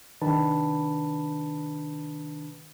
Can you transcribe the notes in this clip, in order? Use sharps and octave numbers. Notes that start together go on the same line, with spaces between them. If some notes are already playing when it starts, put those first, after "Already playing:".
C3 D#3 D4 B4 A5 B5